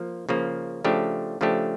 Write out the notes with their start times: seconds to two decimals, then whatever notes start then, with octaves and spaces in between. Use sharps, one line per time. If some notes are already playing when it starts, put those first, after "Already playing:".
Already playing: F3 A#3
0.29 C#3 F3 A#3
0.85 C#3 F3 A3 D4 G4
1.41 C#3 F3 A3 D4 G4